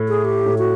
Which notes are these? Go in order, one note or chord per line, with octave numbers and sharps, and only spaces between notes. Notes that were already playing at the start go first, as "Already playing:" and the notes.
Already playing: A2
G#4
G4
A2
F#4